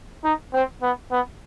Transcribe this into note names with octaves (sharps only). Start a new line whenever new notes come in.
D#4
C4
B3
B3